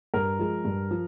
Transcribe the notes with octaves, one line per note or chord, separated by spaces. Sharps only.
G2 A#4
F3 G#3
G2
F3